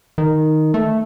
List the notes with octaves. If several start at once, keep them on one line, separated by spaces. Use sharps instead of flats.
D#3
A3